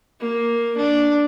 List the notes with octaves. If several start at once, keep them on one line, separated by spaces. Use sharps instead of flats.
A#3
D4